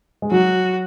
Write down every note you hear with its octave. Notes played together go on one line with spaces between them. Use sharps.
G#3
F#3 F#4